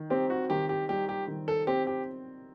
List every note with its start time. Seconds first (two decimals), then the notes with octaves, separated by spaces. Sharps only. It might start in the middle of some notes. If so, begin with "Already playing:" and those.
Already playing: D#3
0.10 C4 G4
0.30 F#4
0.50 D#3 G4
0.69 G4
0.89 G3 G4
1.09 G4
1.28 D#3
1.48 A4
1.67 C4 G4
1.87 G4